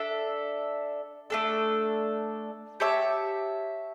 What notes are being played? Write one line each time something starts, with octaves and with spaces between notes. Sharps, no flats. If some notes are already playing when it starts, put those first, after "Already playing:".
Already playing: D4 A4 E5
A3 D4 A4
G4 C#5 E5 A5